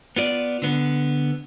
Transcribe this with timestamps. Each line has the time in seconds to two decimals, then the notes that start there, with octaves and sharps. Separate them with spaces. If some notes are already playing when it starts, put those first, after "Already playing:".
0.16 B3 F4 D5
0.62 D3 B3